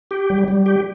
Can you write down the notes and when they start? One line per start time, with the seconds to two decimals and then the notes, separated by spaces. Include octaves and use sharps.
0.11 G4
0.30 G3
0.48 G3
0.66 G4